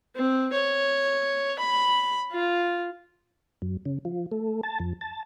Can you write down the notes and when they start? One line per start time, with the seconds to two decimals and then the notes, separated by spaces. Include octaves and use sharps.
0.15 C4
0.52 C#5
1.59 B5
2.32 F4
3.62 F#2
3.85 C#3
4.05 F3
4.31 A3
4.63 A5
4.80 F2
5.01 A5